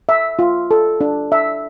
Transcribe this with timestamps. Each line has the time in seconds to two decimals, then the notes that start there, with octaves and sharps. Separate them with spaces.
0.09 E5
0.39 F4
0.71 A4
1.01 D4
1.32 E5